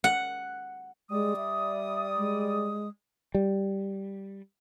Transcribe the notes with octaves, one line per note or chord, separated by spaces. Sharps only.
F#5
G3 G#3 D5 D#6
E5
G#3
G3